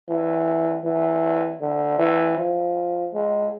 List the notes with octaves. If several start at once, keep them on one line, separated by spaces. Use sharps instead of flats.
E3
E3
D3
E3
F3
G#3